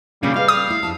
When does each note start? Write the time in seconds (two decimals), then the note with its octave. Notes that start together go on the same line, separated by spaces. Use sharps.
0.23 A#2 C#3 G3 A#3 D4
0.36 G#4 B4 D#5 F5
0.49 A4 D#6
0.68 A3 E4
0.83 F2 E4 A5